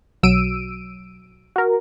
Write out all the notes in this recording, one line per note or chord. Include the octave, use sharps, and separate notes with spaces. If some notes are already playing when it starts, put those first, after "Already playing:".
B1 F#3 E6 D7 D#7
F#4 A#4